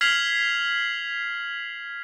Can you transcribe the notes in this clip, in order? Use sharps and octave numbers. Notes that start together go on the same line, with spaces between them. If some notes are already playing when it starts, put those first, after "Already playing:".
F6 G#6 B6 C7 F7 F#7